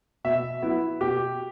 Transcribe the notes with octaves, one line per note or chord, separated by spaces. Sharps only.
B2 E5
F#3 B3 E4
B2 G4